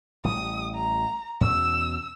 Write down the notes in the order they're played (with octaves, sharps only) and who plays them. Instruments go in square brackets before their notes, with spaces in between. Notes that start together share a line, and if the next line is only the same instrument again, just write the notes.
[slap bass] A1 G3 [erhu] D#6
[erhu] A#5
[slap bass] E2 B2 C#4 [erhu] E6